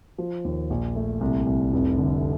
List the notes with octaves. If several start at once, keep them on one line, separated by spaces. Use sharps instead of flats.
F3
D#2
A#1
A3
C2
C2
F1
D3